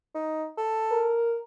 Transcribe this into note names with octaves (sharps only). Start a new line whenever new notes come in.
D#4
A4
A#4